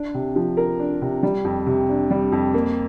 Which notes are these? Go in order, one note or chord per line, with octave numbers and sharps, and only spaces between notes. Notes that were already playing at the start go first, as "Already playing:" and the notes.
Already playing: D4
C3
F3
A#4
D4
C3
G3
F2
C3
D4
G3
F2
A#3